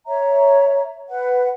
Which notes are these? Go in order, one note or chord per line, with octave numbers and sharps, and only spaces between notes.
C#5 E5 A#5
B4 F#5